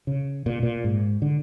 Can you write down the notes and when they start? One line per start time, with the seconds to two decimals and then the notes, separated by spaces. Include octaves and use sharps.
0.07 C#3
0.46 A#2
0.63 A#2
0.84 G#2
1.22 D3